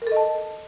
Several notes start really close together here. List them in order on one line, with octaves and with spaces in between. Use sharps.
A#4 A4 D#5 A5